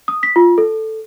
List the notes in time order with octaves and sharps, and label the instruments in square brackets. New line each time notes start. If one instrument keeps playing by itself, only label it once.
[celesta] D#6
B6
F4
A4